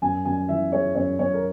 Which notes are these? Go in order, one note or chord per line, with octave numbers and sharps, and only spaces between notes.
F#2 G#5
F#2 G#5
E3 E5
G#3 C#5
F#2 C#5
F#2 C#5
A#4